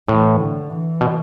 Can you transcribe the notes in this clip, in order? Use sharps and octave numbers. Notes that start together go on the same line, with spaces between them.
A2 E3
D3
E3
B2